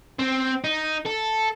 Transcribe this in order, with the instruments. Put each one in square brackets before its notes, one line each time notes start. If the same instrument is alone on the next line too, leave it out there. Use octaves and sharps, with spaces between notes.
[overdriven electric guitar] C4
D#4
A4